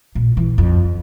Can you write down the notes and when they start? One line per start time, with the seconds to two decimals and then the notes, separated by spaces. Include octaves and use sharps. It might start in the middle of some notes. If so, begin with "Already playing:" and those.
0.15 A#2
0.37 E3
0.58 F2